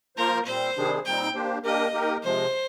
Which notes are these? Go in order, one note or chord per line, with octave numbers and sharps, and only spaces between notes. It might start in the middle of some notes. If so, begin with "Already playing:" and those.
F3 A#3 F4 A#4 C5
A#2 G3 C4 C5
C3 D#3 G3 D4 G#4
A#2 G3 C4 D#4 G5
A#3 D4 G4 C5
A#3 D4 G4 A#4 D#5
A#3 D#4 G4 A#4
C3 F3 G#3 C5